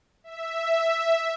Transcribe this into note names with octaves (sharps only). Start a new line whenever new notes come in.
E5